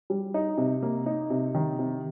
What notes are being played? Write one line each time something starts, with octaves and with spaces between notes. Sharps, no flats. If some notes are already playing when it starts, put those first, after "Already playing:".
G3
D#4
C3
A#3
D#4
C3
D#3
C3